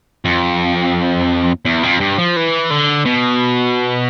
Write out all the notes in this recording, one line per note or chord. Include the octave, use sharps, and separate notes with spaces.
F2
E2
F2
G2
F3
E3
D3
B2